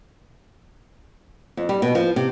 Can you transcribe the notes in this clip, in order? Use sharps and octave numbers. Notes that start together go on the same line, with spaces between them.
F2
G3
B2
F3
C3